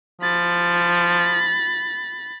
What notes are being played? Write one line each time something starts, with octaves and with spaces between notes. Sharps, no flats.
F3 B5 A6